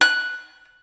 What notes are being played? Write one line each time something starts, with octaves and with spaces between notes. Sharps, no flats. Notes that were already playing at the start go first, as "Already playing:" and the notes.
F#6